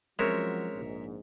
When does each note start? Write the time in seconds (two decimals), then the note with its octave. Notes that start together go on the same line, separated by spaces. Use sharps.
0.19 F3 F#3 G#3 C4 C#4 A#4 C#5 E5
0.74 A#1 G#2